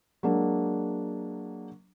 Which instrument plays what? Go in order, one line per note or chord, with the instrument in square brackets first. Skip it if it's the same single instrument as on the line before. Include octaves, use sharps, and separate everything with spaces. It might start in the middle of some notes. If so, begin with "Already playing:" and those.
[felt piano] F#3 G#3 A#3 D4